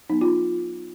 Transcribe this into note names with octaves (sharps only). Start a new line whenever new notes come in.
F#3 B3 D#4
F4